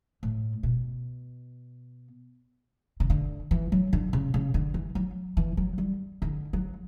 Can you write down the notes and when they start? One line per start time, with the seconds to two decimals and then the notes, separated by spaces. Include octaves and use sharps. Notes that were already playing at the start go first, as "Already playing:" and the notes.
0.23 A2
0.63 B2
3.00 C#3
3.10 D3
3.51 E3
3.72 F#3
3.93 D3
4.13 C#3
4.34 C#3
4.54 D3
4.74 E3
4.95 F#3
5.37 E3
5.57 F#3
5.78 G3
6.22 C#3
6.25 D3
6.53 F#3